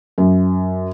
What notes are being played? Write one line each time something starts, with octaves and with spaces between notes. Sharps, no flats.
F#2